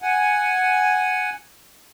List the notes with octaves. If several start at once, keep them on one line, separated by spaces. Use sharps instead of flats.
F#5 G#5